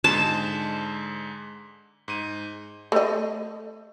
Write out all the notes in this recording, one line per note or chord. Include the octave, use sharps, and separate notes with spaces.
G#2 D3 G#3 A5
G#2 D#7
A3 D#5